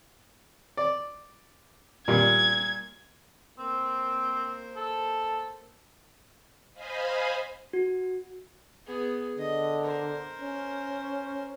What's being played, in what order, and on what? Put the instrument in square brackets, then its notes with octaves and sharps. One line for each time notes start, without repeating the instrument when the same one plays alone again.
[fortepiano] D5
[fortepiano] A#2 G3 [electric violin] G#6
[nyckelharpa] A#3 C5 [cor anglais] C4
[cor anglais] A4
[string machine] C5 D#5 F5 G#5 B5
[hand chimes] F#4
[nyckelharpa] B3 G#4
[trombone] D3 [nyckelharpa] D#5
[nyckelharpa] A#4 C5
[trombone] C#4